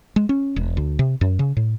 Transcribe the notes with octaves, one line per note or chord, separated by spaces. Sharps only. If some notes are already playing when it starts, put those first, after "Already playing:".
G#3
C#4
E1
D2
C3
F#2
C#3
A2